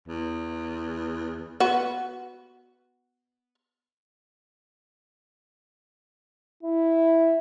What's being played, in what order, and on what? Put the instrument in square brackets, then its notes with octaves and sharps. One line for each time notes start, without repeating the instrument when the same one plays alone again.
[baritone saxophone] E2
[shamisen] B3 F#4
[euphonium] E4